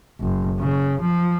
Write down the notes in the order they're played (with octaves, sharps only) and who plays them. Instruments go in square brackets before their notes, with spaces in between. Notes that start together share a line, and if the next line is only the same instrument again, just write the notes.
[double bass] F#1
C#3
F3